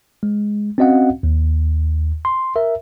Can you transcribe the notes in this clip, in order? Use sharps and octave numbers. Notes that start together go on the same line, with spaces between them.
G#3
C4 C#4 F#4 D#5 F5 F#5
D#2
C6
A#4 E5